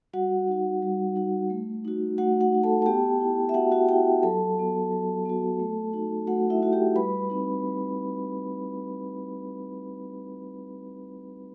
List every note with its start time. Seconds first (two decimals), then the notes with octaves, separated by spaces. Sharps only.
0.13 G3 F#4 F#5
0.48 D#4 F#4
0.82 G3
1.16 D#4 F#4
1.50 A3
1.85 D#4 F#4
2.18 A3 F#4 F#5
2.40 F#4 F#5
2.52 D#4 F#4
2.63 A4 A5
2.82 A5
2.86 B3 G4 G5
3.21 E4
3.49 E5
3.54 B3 F#4 F#5
3.71 F#4 F#5
3.88 E4 G4 G5
4.23 F#3 A4 A5
4.57 B3 F#4
4.91 F#3
5.25 B3 F#4
5.60 A3
5.94 D#4 F#4
6.27 A3 F#4 F#5
6.50 E4 E5
6.62 D#4 F#4
6.73 G4 G5
6.96 G3 B4 B5
7.30 C4 D#4